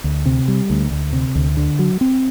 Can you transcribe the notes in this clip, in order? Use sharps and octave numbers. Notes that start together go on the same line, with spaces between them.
D2
C3
G3
D2
D2
C3
D2
D3
F#3
C4